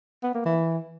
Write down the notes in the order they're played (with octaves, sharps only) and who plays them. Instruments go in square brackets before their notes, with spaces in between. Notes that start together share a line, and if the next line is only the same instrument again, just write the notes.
[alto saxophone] B3
A#3
E3